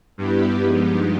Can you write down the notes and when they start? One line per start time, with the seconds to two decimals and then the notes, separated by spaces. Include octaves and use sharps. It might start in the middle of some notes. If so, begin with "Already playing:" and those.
0.18 G2 G3 B3 E4 G4 B4
0.63 F3 G#3 B3 D#4 G4